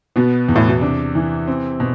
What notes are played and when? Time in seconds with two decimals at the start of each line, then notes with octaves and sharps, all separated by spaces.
0.16 B2 B3
0.48 E2
0.56 A2
0.68 B2
0.81 C3 D4
1.15 E3
1.47 C4
1.80 B2